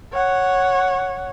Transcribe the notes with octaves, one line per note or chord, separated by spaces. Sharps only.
C#5 F#5